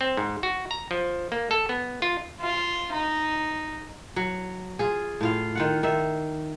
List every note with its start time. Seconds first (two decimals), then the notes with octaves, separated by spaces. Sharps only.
0.01 C4
0.17 G#2
0.43 F#4
0.71 A#5
0.91 F3
1.32 A#3
1.51 A4
1.69 B3
2.02 F4
2.40 F4
2.92 D#4
4.16 F#3
4.79 F4 G#4
5.21 A2 F4 F5
5.55 D#3 F4 F#5
5.83 D#3 E5